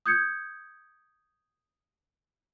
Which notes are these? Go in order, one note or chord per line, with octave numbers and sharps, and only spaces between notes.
D#6 G6 G#6 C#7